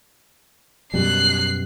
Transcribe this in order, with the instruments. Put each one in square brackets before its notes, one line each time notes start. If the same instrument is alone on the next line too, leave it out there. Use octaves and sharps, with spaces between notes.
[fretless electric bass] F#2 B2 G3 [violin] F#6 C7